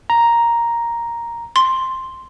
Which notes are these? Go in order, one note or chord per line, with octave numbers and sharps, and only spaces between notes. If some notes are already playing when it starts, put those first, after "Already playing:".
A#5
C6